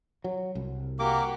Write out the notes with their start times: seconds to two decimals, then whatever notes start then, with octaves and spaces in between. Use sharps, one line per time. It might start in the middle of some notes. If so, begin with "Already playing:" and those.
0.24 F#3
0.55 C2
0.99 A#3 F#4 G4 D6